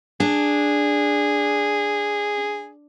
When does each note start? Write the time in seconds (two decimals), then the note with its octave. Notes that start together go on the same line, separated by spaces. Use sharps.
0.20 D4 G#4